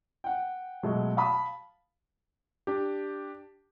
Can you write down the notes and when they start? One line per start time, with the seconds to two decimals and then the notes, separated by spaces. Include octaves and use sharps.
0.24 F#5 G5
0.83 B2 F#3 G#3 A3
1.17 F5 A5 B5 D#6
2.67 D4 G4